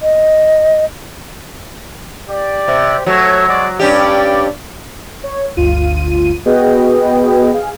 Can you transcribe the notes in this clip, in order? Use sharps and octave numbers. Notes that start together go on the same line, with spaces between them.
D#5
G4 D5
C3
F#3 A3 C#5
G#3 F#4 D5
G2 C#4 G4 D5
C#5
G1 D2 F4 D#7
B3 F#4 G#4 B4 D#5 G5
G#4 F5